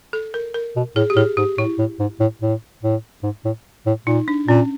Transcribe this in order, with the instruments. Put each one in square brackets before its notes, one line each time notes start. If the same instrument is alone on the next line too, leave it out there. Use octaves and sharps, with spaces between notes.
[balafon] A4
A#4
A#4
[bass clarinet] B2
[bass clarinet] A2 [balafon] G#4
[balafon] G4
[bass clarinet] A2 [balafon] G#4
[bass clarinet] G#2 [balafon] G4
[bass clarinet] A2 [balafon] E4
[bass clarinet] A2
G#2
A2
A2
A2
G#2
A2
A2
[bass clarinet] A#2 [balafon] D#4
[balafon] D4
[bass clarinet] A#2 [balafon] C#4